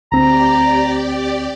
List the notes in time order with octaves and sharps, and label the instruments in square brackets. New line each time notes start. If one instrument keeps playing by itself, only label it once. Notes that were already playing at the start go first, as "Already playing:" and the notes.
[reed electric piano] D2 C4 [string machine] G4 D5 [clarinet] A#5